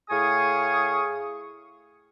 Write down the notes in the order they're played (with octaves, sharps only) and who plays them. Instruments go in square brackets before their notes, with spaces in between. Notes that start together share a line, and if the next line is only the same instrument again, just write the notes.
[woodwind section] A2 G#4 F5 G#5 C#6 D#6